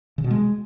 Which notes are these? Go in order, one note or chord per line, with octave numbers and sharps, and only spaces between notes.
C#3
B2
G#3